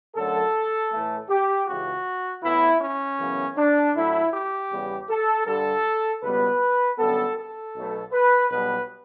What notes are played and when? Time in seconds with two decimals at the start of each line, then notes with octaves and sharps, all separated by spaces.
0.16 F#2 D3 F#3 A3 A4
0.92 A2 E3 A3
1.29 G4
1.67 C#2 C#3 E3 F#4
2.43 A2 E3 B3 E4
2.81 C#4
3.19 F#2 C#3 E3 B3
3.57 D4
3.95 A2 F#3 A3 E4
4.33 G4
4.71 E2 C#3 G3 B3
5.09 A4
5.46 G2 D3 G3 A4
6.22 C#2 B2 G3 B3 B4
6.98 F#2 D3 G3 B3 A4
7.37 A4
7.75 B1 B2 F#3 A3
8.12 B4
8.50 B1 B2 G3 B4